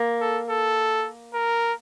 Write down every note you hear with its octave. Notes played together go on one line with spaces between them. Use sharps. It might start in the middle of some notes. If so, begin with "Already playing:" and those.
Already playing: A#3
A4
A4
A#4